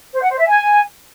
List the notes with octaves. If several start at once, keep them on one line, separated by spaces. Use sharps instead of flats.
C5
F#5
C5
E5
G#5